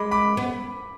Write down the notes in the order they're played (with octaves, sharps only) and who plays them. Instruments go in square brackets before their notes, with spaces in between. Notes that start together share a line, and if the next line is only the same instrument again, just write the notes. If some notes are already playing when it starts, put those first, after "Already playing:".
Already playing: [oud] G#3 [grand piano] B5 D6
[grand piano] B5 D6
[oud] B3